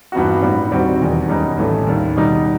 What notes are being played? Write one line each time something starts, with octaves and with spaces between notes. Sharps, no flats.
G2 E3 B3 D#4 F#4
A2 G3 B3 D#4
D#2 D#3 G3 C4 F#4
E1 E2 D#3
F#2 D#3 G3 B3 D#4
A1 A2 E3 A3
D#2 D#3 G3
B2 G3 D#4